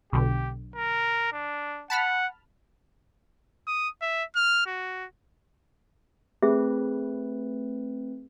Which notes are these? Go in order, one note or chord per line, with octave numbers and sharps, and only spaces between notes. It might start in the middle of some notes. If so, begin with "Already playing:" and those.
B1 B2 D3 G4
A#4
D4
F#5 A5 B5 F6
D#6
E5
F6
F#4
A3 C4 G#4 B4 E5